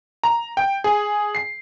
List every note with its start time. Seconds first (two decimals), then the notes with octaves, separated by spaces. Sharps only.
0.23 A#5
0.57 G5
0.84 G#4
1.35 C7